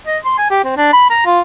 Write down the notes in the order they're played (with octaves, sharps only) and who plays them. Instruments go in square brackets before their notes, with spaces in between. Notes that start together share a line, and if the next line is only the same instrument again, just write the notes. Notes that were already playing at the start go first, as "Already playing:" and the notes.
[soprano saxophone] D#5
C6
G#5
G4
C4
D4
B5
A#5
F4